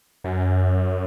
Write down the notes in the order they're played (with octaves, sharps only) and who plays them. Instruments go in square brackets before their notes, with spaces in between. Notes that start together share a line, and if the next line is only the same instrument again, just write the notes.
[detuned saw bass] F#2